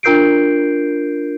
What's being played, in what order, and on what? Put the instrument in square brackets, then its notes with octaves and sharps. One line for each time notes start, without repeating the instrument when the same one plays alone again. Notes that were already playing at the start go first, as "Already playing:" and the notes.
[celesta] D4 F4 A#4 G6 C7 D7